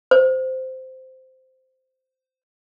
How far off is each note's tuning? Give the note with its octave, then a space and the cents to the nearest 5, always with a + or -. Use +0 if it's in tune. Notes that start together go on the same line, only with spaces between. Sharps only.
C5 -10